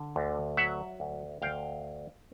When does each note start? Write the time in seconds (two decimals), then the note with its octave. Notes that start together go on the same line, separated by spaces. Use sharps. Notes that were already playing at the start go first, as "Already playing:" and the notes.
Already playing: D3
0.16 D2
0.57 F#3 E5 F#5
1.00 D2
1.42 D2 F5 G5